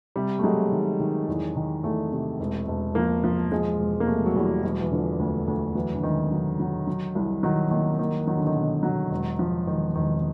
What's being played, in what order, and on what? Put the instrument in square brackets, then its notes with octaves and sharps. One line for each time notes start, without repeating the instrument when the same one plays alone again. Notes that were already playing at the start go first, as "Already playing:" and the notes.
[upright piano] C3 [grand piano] G3
[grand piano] A3
[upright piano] F#3 [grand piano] G#3
[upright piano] D#3
D#3
E2
D#3
[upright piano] E2 [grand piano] A3
[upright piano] C3
E1
E1
[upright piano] F3 [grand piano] A#3
[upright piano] F3
[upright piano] F3 [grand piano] G#3
[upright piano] E1
[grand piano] A#3
[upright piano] C3 [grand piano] A3
[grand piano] F#3
[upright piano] E2 [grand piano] G3
[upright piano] E1 [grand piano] F#3
[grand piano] E3
[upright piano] D3 [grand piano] F3
[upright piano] D2
D2
[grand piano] E3 [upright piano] F#3
[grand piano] D3
[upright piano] E1 [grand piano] D#3
[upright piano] F#3
F#3
F#3
C2
[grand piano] D#3 [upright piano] F#3
[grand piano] D#3 [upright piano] A#3
[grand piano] D#3 [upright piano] A#3
[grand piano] D#3 [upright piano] F#3
[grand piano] D3
D#3
[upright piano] B2
F#3
E1
F3
[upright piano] E1 [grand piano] D#3
[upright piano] E1 [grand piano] D#3